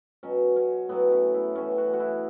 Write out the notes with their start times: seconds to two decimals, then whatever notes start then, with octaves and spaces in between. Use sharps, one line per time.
0.23 B2 F#3 C#4
0.56 C#4
0.89 A2 F#3 B3
1.12 C#4
1.34 E4
1.55 A2 E3 C#4
1.78 F#4
1.93 F#4
2.00 E4